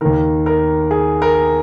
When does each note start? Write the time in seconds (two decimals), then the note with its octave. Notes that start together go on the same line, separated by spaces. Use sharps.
0.01 D#2 D#3 A#4
0.46 A#4
0.91 G#4
1.22 A#4